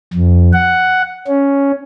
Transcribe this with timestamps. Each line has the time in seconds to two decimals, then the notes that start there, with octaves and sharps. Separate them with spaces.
0.14 F2
0.53 F#5
1.27 C#4